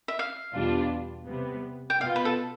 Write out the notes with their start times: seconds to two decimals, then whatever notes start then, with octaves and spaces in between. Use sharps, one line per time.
0.08 E5
0.19 F5
0.55 E2 B2 G3 D4 F4
1.28 C3 G3 B3
1.90 G5
2.01 B2 B3 F4 F5
2.16 B4
2.25 A4